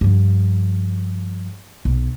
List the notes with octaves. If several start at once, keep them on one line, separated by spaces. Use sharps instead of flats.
G2 F3
B1